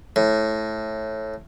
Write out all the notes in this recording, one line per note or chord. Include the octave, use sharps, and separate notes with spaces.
A2